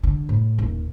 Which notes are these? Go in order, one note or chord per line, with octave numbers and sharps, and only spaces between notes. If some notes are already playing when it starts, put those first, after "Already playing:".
D3
A2
D#1